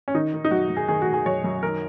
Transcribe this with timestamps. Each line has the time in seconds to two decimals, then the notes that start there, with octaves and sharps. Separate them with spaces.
0.08 C#4
0.14 D#3 D#4
0.34 D#3
0.45 D#4
0.51 F#2 F#4
0.70 F#2
0.77 G#4
0.88 D#3 G#4
1.02 F#4
1.07 D#3
1.13 G#4
1.26 F#2 C#5
1.44 F#2
1.63 D#3 A#4